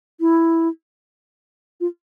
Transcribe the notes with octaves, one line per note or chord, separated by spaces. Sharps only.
E4
F4